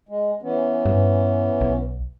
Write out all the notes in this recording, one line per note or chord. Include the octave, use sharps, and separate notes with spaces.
G#3
E3 B3 C#4
G2
B1